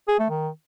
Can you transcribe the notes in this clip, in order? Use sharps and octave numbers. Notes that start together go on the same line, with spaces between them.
G#4
A3
D#3